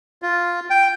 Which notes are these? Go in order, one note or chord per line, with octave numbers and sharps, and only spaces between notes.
F4
G5